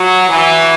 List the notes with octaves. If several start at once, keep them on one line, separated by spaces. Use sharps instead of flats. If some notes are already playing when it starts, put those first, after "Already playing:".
Already playing: F#3
E3